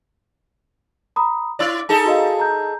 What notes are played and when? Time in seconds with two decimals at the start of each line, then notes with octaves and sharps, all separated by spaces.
1.16 A#5 B5 D#6
1.59 E4 C#5 D5 E6 A6
1.89 D#4 G#4 A4 A5
2.06 F#4 D#5 F5
2.40 A#5 G6